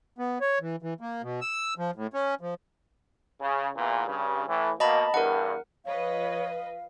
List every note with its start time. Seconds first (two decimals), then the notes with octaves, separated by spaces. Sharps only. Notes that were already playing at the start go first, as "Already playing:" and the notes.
0.19 B3
0.41 C#5
0.61 E3
0.82 E3
1.01 A#3
1.22 B2
1.41 E6
1.78 F3
1.96 A2
2.14 C#4
2.41 F3
3.41 C#3
3.76 E2 A#2
4.07 G2 C#3
4.48 A2 E3
4.80 B2 A#3 D#5 A5 B5
5.14 E2 G2 A#4 F#5
5.85 F3 B4 C#5 D#5 F5